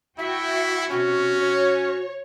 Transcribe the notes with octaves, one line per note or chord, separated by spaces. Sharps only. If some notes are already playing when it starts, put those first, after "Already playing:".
E4 F#4 E5 G5 C#7
C3 C#4 F#4
C#5